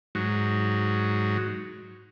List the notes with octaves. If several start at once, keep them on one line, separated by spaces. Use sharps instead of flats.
G#2 F#3